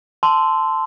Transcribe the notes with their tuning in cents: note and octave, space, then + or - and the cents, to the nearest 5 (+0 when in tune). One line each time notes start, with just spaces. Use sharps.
A5 +0 C6 -15 E6 +0